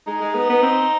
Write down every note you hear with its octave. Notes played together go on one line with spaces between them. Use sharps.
G#3 D#4
G#3
B3
B3
C4